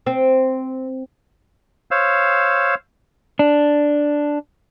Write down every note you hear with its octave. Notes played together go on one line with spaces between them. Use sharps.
C4
C5 C#5 F5 E6
D4